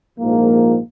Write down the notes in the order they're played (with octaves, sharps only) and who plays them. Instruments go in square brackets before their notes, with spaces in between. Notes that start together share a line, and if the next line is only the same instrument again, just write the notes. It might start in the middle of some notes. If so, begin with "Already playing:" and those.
[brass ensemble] A#1 G#2 F3 A#3